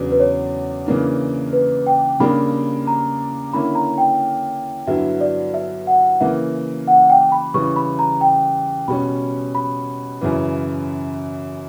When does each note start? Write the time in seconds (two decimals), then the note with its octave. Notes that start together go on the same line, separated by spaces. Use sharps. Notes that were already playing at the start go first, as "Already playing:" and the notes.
Already playing: E2 C#3 F#3 B3 D4
0.12 B4
0.20 C#5
0.86 C#3 E3 A#3 D4
1.53 B4
1.87 G5
2.20 C#3 G3 A#3 D4 G4 B5
2.87 A#5
3.53 D3 A#3 C#4 E4 B5
3.75 A#5
3.98 G5
4.87 G2 D3 F#3 B3 E4 E5
5.21 D5
5.54 E5
5.87 F#5
6.20 C#3 E3 A#3 E5
6.87 F#5
7.10 G5
7.32 B5
7.54 C#3 E3 G3 C#6
7.76 B5
7.99 A#5
8.21 G5
8.88 B2 G3 C#4 B5
9.55 B5
10.21 F#2 C#3 E3